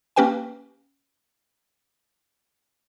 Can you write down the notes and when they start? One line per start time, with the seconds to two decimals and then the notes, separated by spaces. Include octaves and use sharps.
0.16 A#3 C#4 G4 B4 G5 G#5